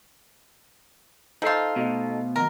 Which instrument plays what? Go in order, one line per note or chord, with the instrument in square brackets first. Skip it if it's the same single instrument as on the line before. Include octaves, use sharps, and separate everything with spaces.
[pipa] F3 F4 [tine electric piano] D#4 A4 C7 [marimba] D#5 G6
[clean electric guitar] B2 [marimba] A3
[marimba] D#3 F#3 [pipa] A#4